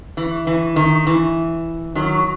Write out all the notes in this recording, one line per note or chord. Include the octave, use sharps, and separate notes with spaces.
E3
E3
D#3
E3
D#3 F#3